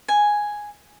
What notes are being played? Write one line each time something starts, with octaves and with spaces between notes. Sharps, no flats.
G#5